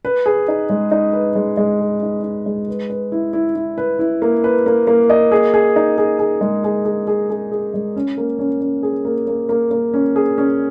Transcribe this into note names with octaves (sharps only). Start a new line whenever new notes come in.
B4
G#4
D#4
G#3
D#4
B4
G#3
G#3
G#4
D#4
D#4
G#3
B4
B4
E4
E4
E4
B4
E4
A#3
B4
A#3
A#3
D#5
G#4
G#4
D#4
G#4
G#4
G#3
G#4
G#4
G#4
G#4
G#4
G#3
C#4
A#3
C#4
C#4
G#4
A#3
A#3
A#3
A#3
C#4
G#4
C#4